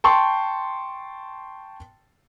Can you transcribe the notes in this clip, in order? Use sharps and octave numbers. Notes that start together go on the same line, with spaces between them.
G5 A5 C6 C#6